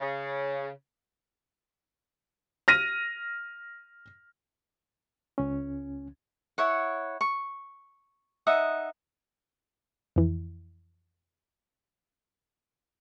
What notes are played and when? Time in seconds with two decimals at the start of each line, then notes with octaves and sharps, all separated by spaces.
0.01 C#3
2.68 F6 A#6 D#7
5.38 C#2 C#4
6.58 E4 C#5 F#5
7.21 C#6
8.47 D#4 E5 F#5 D#6
10.16 F2 E3